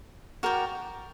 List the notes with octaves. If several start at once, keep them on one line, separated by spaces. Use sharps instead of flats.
F#4 A#4 D5 G5